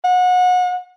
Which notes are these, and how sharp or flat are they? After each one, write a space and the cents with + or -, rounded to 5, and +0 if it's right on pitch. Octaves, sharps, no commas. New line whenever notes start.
F#5 -30